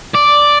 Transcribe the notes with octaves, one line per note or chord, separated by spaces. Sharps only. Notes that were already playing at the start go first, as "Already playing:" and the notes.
D5